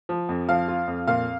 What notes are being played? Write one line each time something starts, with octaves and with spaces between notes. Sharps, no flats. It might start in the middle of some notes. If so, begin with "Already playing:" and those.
F3
F2
F3 F5
F4
F2
A#2 F5